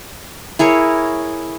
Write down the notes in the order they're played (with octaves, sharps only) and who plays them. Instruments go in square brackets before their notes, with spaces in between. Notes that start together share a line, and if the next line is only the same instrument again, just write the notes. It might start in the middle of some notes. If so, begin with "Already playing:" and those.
[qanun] E4 G#4 A#4 C#5